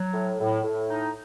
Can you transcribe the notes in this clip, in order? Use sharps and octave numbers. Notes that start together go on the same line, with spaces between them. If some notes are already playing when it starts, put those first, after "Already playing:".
Already playing: F#3
A2
A2
A2
D#4